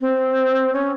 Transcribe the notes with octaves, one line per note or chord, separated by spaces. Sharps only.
C4
C#4